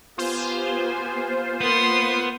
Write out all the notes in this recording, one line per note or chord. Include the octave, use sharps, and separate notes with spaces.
B3 F4 G4 C5 G#5
A#3 B3 C6 D#6